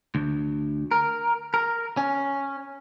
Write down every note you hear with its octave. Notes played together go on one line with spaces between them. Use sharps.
D2
A#4
A#4
C#4